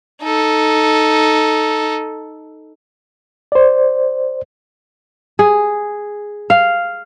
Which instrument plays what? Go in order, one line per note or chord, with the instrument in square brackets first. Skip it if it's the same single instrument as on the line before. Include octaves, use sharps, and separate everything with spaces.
[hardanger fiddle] D#4 A4
[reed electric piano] C5 D5
[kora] G#4
F5